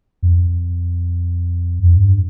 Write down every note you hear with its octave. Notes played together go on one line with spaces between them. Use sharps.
F2
F2
G2